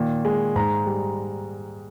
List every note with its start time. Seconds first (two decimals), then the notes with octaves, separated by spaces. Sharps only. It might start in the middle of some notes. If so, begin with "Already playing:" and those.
Already playing: A#2 D#3
0.25 G#3
0.55 G#2 A#5
0.86 G3